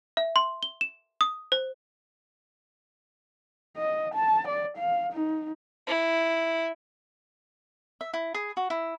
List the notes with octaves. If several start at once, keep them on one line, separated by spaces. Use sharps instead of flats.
E5
C6
G7
E7
D#6
C5
D#5
A5
D5
F5
D#4
E4
E5
E4
G#4
F#4
E4